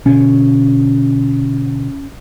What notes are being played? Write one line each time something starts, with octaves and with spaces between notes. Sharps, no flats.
B2 D3 C#4